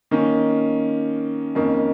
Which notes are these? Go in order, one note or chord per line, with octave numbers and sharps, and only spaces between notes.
D#3 A#3 C#4
F2 D#3 A#3 C#4